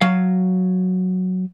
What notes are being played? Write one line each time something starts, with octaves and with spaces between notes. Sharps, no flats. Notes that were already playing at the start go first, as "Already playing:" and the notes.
F#3 F5